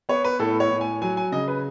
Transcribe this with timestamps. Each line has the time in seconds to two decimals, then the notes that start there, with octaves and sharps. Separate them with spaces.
0.09 B3 C#5
0.24 B4
0.39 A2 A4
0.60 C#5
0.71 A2
0.81 G#5
1.02 F#3 G#5
1.17 G#5
1.32 C#3 D#5
1.48 B4